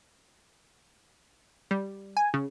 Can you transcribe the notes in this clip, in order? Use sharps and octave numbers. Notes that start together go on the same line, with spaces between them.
G3
G#5
C#3